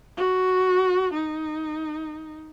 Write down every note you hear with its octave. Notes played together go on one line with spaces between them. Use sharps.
F#4
D#4